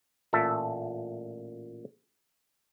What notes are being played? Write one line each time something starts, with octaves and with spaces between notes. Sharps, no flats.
A1 A#2 A4 E5